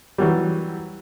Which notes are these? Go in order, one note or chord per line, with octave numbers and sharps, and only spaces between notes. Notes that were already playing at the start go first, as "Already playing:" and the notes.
E3 F#3 G3